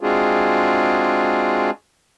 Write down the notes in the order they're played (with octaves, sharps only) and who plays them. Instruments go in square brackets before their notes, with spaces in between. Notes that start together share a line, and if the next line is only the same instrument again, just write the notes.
[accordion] G#3 C4 D4 F4 F#4 G#4